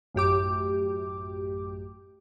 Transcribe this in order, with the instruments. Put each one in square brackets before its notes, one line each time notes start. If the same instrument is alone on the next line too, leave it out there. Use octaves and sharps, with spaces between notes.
[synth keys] A1 F#2 G4 D6